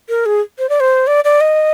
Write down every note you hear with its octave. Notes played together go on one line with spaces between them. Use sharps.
A#4
G#4
C5
D5
C5
D5
D5
D#5